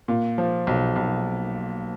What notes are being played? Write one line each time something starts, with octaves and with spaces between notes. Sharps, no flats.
A#2
F3
B1
B1